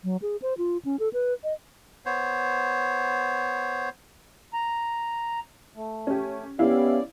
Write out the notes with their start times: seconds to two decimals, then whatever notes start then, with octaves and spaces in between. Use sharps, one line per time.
0.04 F#3
0.22 G#4
0.42 C5
0.58 F4
0.85 C#4
0.99 A4
1.13 B4
1.44 D#5
2.06 B3 C5 C#5
4.53 A#5
5.76 A3
6.07 C#4 G4
6.59 B3 C#4 E4 G4 D5 F5